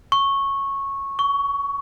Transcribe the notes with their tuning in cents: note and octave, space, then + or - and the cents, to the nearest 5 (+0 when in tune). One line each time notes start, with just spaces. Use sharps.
C#6 -10
C#6 +20